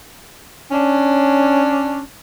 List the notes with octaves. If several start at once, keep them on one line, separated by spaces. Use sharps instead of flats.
C#4 D4